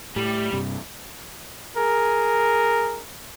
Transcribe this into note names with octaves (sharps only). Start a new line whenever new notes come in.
A2 G3
G2 C3
G#4 A#4